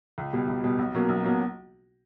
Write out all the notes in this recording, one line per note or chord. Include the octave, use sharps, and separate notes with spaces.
C#2
B2 G3
C#2
B2 G3
B1
B2 F#3 A#3 C#4
B1
B2 F#3 A#3 C#4